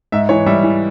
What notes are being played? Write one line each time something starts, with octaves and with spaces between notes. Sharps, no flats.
G#2 E5
E3 C#5
G3 E5
E3